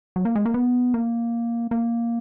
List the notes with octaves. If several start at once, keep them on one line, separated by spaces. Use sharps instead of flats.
F#3
A#3
G#3
A#3
B3
A#3
A#3